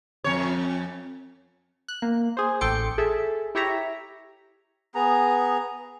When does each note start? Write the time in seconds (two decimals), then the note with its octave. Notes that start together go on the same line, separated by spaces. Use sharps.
0.24 F2 C#5
1.88 F#6
2.02 A#3
2.37 G#4 C5
2.61 A1 A4 G5 C6 D6 C#7
2.98 G#4 A4 E5
3.55 E4 G4 C#5 E5 A#5
4.95 B3 G#4 A#5